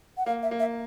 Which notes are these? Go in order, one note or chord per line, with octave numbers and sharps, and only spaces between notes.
F#5
A#3 F5
E5
A#3
E5